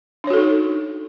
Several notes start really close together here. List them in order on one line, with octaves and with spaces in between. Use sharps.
D4 C#5 F#4 A4 D#4